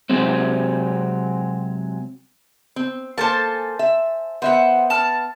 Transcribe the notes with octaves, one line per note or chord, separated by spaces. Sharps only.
C3 F#3 G#3 C4
C4
A#3 A4 C5 G#5 A5
E5
B3 C5 E5 F#5
A5 F6